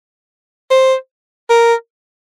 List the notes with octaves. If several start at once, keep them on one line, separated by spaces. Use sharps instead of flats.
C5
A#4